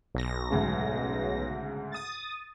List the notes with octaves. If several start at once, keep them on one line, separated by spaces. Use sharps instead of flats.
B1 A#6
D2 G#2 C#3
D#6 A6